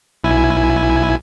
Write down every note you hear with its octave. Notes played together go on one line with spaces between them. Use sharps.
B1 E4 G#5